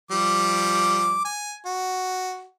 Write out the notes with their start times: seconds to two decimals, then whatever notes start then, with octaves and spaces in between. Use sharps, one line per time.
0.11 F3 G3 D6
1.25 G#5
1.65 F#4